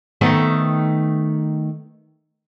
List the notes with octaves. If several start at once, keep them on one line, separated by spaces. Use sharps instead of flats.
D#3 A3 B3